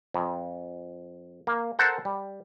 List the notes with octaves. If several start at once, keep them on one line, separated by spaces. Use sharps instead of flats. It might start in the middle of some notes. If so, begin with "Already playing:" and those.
F2
A#3
A4 A#4 C5 F#5 A5
G3